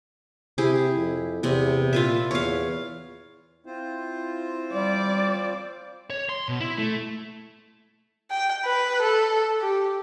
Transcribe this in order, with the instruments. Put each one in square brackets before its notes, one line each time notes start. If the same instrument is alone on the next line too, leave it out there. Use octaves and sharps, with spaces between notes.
[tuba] C3 [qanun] E4 G4 G#4
[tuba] F2
[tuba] E2 [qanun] C3 B3
[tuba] A#2 [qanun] F4 B4 E5
[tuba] E2 [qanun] C#5 F5
[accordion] C4 F4 C5 [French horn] E4
[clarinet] G3 [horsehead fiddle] D5
[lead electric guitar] C#5
C6
B2
E4
A3
[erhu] G5
B4
A4
G4